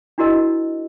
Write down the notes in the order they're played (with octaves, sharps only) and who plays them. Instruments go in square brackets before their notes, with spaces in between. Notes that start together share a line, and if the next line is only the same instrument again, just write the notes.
[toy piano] D4 E4 F#4 A#4 D#5